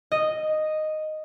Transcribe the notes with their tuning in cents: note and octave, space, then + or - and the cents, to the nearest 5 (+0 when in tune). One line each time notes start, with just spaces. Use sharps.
D#5 -5